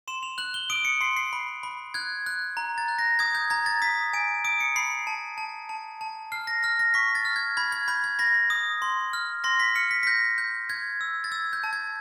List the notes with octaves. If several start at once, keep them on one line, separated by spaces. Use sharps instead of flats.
C6 E7
F7
F#6 F#7
G7
D#6 D7
C#7
C6 C7
C7
B5
B5
F#6 G#6
F#6
A#5
A6
F#6
A#6
D#6 G#6
G6
A#5 G#6
A6
D#6 B6
G#5 D7
D#6 D7
C#7
B5 C7
A5
A5
A5
A5
F6 C7
A#6
F6 A#6
A#6
C#6 B6
A6
F6
G#6
B5 G#6
G#6
B5 G6
G#6
B5 A#6
D#6
C6
F6
C6 A#6
B6
F6 C#7
B6
B6
G6 A#6
G6
G6 G#6
E6
A6
E6 G#6
G6
A5
G#6